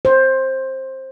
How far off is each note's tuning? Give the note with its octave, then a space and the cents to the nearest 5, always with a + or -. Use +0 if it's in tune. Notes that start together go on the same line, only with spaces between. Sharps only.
C5 +15